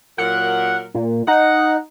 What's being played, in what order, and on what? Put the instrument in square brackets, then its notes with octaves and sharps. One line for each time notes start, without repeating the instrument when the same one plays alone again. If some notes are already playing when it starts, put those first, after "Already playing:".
[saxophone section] A#2 F#3 A#4 [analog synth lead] F#5
[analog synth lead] A#2
[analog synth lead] D#4 [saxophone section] F#5